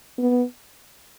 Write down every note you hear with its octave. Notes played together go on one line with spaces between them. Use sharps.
B3